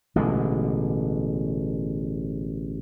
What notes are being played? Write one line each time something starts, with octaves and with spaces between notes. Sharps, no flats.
A1 B2 D3 G#3